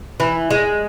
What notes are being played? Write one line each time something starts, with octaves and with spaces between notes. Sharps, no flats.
E3
G#3